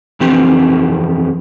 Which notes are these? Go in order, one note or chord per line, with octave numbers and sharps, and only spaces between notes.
F2 E3 C4 G4